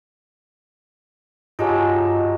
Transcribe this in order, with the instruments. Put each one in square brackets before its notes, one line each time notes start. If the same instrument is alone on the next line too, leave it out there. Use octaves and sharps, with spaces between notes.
[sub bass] G2 [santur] F#3 G#3 D#4 [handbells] F4 G4 A5